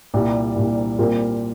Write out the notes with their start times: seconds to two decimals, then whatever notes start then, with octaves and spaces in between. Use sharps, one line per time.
0.14 C2 A#2 G3
0.56 C2 A#2 G3
0.98 A#2 G3 C4 F4 A#4